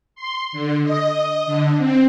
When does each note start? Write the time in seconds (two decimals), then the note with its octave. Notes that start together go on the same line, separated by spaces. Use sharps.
0.15 C6
0.52 D3
0.83 D#5
1.46 D3
1.78 C4